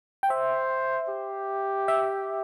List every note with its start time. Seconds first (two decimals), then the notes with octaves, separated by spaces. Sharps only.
0.23 G5
0.30 C5 E5
1.09 G4
1.88 E5